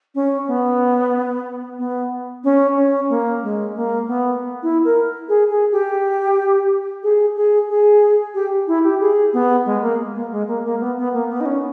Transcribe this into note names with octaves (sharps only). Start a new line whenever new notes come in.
C#4
B3
B3
C#4
C#4
A#3
G#3
A#3
B3
E4
A#4
G#4
G#4
G4
G#4
G#4
G#4
G4
E4
G4
G#4
B3
G#3
A#3
A#3
G#3
A#3
A#3
B3
B3
A#3
B3
D#4
C#4